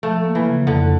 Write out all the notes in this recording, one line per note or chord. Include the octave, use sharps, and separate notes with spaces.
F3 A3
A#3
E3
C#3
F2 D3